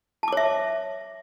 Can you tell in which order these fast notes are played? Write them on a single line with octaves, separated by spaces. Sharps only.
A5 D6 C#5 E5